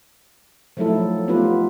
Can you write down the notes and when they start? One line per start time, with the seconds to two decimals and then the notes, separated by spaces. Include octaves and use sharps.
0.77 F3 F#3 A3 D#4 E4 A4
1.28 A3 B3 D#4 F4 G4 B4